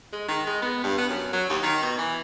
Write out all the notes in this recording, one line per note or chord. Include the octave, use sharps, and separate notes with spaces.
G#3
D#3
G#3
B3
G2
B3
F#2
F#3
D#2
D#3
B2
E3